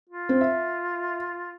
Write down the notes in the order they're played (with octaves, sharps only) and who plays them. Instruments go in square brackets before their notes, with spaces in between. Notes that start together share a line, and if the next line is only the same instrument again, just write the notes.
[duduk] F4
[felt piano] C4
E5